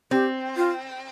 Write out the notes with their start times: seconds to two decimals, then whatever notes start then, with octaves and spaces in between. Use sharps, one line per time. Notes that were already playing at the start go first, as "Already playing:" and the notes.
0.11 C4 G4
0.57 F4